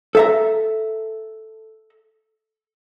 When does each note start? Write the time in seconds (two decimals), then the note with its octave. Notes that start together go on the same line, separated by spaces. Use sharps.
0.15 A4 E5 A#5